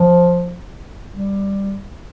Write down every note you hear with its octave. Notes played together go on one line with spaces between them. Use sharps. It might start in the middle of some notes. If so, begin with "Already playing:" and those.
Already playing: F3
G3